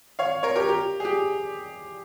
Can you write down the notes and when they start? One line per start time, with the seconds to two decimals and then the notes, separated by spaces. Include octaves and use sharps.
0.19 C#5 F5
0.43 A#4 C#5
0.56 G4 A#4
0.69 G4
1.00 G#4
1.05 G4